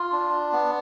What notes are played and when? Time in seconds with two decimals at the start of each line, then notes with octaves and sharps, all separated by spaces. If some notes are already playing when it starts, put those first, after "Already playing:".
Already playing: F4
0.12 D4
0.52 B3